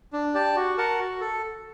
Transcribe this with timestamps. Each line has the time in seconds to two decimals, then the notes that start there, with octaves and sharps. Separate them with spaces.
0.13 D4
0.34 G4 D5 A5
0.56 F#4
0.78 A#4 F#5 A5
0.99 F#4
1.20 A4